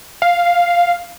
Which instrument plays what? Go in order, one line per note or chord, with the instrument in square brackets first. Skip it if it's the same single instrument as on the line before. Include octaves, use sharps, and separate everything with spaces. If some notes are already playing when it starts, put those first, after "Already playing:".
[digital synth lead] F5